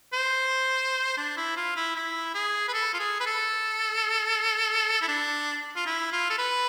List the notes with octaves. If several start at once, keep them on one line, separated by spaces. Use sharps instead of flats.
C5
D4
E4
F4
E4
E4
G#4
B4
A4
F4
G#4
B4
A4
E4
D4
F4
E4
F4
A4
B4